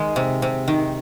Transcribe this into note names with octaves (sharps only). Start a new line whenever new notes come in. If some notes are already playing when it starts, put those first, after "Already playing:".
Already playing: D#3 G#3
C3
C3
D#3